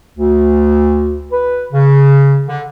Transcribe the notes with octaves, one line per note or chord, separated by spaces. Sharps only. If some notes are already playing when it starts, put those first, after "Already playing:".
D2
B4
C#3
D3